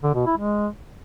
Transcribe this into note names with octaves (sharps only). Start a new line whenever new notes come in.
D3
B2
E4
G#3